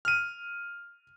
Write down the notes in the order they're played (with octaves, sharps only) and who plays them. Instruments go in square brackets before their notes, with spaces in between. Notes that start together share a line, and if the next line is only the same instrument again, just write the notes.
[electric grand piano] F6 D#7